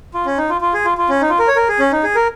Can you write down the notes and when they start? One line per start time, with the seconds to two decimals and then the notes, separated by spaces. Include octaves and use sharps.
0.14 F4
0.26 C#4
0.38 D#4
0.50 F4
0.61 F4
0.74 G#4
0.85 F4
0.98 F4
1.09 C#4
1.21 D#4
1.30 F4
1.39 A#4
1.48 C#5
1.56 A#4
1.69 G#4
1.79 C#4
1.92 D#4
2.04 G#4
2.15 A#4